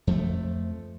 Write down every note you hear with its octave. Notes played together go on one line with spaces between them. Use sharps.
F2 F3 A3